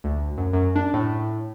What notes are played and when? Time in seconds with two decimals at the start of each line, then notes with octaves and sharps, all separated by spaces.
0.04 D2
0.38 F#2
0.53 F#2
0.76 D4
0.94 A2